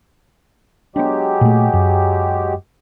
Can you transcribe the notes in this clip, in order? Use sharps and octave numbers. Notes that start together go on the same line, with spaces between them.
F#3 G#3 B3 D4 G4
A#2 A3
F#2